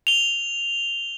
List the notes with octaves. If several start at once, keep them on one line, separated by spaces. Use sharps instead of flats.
F7 G7